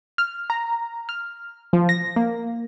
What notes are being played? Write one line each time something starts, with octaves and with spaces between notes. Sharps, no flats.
F6
A#5
F6
F3
A#6
A#3